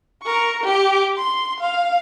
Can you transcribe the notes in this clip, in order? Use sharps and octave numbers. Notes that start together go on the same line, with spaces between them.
A#4 C#6
G4 D6
C6
F5